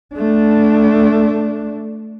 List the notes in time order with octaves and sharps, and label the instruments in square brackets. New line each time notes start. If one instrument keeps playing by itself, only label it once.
[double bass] A3 D4